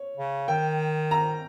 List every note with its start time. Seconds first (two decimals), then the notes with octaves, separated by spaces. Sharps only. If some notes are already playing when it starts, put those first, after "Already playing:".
Already playing: C#5
0.17 C#3
0.48 D#3 G5
1.11 A#5